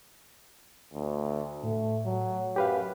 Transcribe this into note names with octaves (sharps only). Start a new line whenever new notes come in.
D2
A2 A3
F#3
F#2 G4 B4 F5